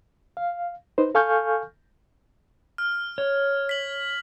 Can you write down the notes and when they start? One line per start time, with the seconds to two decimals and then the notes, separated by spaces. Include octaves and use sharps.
0.37 F5
0.98 D#4 B4 C5
1.15 A4 F5 G#5 C#6 F6 G6
2.78 F6
3.18 C#5
3.69 B6 F#7